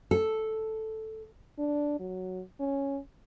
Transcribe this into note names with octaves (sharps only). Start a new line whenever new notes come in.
A4
D4
F#3
C#4